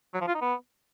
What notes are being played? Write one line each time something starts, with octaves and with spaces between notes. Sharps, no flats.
F#3
F3
F4
D#4
B3